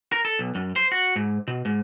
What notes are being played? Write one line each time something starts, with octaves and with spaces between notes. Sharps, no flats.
A#4
A4
B1
F#2
C5
F#4
G#2
B2
G#2